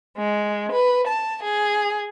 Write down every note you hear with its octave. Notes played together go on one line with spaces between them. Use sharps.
G#3
B4
A5
G#4